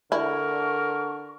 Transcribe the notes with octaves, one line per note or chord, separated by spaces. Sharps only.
D3 E4 A#4 C#6